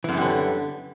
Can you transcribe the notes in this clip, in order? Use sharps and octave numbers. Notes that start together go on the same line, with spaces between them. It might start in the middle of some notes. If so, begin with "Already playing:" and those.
F#2 D3 E3 G3 B3